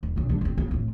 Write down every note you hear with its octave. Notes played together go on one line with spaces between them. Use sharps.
D#1
B1 G2
G3 D4
F1 C4
C#3 B3
F1 A2